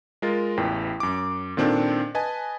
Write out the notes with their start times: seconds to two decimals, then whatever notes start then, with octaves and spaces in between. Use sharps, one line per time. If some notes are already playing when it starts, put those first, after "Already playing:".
0.22 G#3 F4 A#4 A6
0.57 A1 E2 E3 E4 G5
1.00 F#2 D6
1.57 A#2 D#3 C4 D4 A4
2.15 B4 D#5 G#5 A5